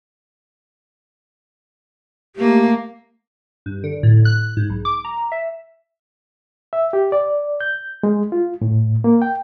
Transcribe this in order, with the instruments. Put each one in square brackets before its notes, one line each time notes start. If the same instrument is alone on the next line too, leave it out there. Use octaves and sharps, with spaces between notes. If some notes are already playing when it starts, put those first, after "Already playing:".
[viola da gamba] A3 A#3 [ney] G4
[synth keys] G2
D3
A2
F#6
G#2
B1
D6
A#5
E5
[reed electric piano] E5
G4
D5
G6
G#3
F4
A2
A#3
G5